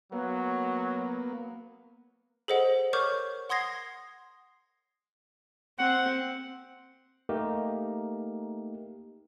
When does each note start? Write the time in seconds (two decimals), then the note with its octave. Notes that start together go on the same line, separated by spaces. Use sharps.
0.12 F#3 A#3 B3
2.48 G#4 A4 C5 D#5 F#5
2.93 A#4 C#5 C#6 D6 F6 G6
3.50 F#5 C6 D#6 G#6 A#6 C7
5.79 C4 F#5
7.29 A3 A#3 D#4 G4 A#4